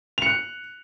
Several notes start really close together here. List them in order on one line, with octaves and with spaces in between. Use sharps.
F7 C#7 F#6